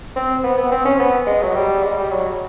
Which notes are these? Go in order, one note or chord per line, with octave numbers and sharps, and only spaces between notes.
C4
B3
B3
C4
C#4
B3
G#3
F#3
G3
G#3
G3
F#3